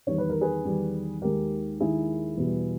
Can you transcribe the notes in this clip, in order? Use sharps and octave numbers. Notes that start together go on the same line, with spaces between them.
E2 D#3 G3 C#5
B4
A#4
G#4 B4
E2 D#3 G3
D#2 D#3 G#3 G4 A#4
D#2 D#3 G#3 E4 G#4
E2 B2 G3